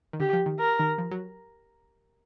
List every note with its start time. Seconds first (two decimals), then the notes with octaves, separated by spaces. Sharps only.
0.13 D#3
0.20 D3 G4
0.33 F3
0.46 D#3
0.59 A#4
0.79 D#3
0.98 F3
1.11 F#3